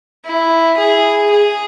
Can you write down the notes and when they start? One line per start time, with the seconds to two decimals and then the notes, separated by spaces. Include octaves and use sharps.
0.25 E4
0.78 G#4
1.31 G#4